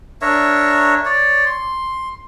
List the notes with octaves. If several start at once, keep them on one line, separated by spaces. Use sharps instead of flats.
D4 A#4 C#5 E5
C#5 D5
C6